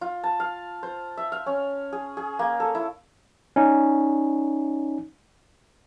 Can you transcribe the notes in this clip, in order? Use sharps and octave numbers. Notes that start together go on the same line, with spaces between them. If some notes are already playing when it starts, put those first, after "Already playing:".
F4
A5
F5
C5
E5
F5
C#4
G#4
G#4
A#3
A4
E4
C#4 D#4